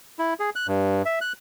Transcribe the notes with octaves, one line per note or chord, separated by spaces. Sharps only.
E4
G#4
F#6
G2
E5
F#6